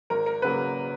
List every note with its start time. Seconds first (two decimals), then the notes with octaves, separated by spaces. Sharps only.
0.10 G#1 A#4
0.26 A#4
0.42 C#3 F#3 A#3 B4